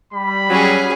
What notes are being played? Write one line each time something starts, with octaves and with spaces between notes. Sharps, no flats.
G3 B5
F#3 C#4 G#4